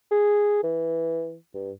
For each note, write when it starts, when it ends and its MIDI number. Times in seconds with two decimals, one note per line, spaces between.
0.11 0.61 68
0.63 1.35 52
1.54 1.71 43